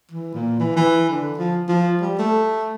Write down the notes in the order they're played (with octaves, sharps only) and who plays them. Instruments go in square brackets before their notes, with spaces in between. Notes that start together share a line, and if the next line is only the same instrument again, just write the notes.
[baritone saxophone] E3
A#2
E3
E3
D3
F3
F3
G3
A3